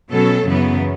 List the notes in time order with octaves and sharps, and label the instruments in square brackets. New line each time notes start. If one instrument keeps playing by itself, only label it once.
[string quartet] B2 [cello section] F#3 C#4 A4
[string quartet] F#2 [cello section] C#3 E3 B3